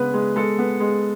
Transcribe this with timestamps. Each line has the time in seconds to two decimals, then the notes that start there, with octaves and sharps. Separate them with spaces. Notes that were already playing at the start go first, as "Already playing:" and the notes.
Already playing: C#3 G#3 B3 D4 B4
0.14 G#3
0.36 G#3 A4
0.59 B3
0.80 G#3